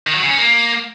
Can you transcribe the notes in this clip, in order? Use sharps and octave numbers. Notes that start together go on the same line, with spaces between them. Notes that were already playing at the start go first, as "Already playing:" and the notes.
D#3
F#3
C#3
C#4
A#3